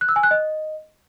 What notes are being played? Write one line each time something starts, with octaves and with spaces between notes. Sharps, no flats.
F#6
E6
G#5
F#6
D#5